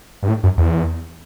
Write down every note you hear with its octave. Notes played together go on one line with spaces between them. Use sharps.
G2
A2
F#2
E2